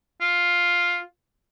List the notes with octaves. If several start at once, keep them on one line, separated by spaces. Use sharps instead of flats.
F4